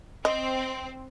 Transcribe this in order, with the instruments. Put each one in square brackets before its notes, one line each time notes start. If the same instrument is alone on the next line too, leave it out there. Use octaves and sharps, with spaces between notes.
[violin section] C4 [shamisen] D#5